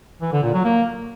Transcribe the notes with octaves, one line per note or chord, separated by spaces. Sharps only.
E3
D3
A#2
F#3
A#3